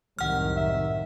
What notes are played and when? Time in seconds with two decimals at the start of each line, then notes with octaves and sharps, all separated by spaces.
0.19 C2 F#2 A2 D#3 F#5 F6
0.57 E5